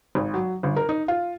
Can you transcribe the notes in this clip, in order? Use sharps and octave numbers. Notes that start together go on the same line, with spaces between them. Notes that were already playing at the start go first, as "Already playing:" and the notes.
G#1
F#3
G1
A#4
D#4
F4